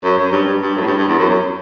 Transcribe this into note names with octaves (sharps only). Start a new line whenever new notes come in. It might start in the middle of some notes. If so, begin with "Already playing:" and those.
F#2
F#2
G2
G2
G2
F#2
A2
G2
G2
E2
F#2
F#2